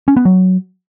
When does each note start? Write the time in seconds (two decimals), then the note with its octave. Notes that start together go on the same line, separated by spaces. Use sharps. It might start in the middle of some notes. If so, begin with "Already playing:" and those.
0.08 C#4
0.17 B3
0.25 F#3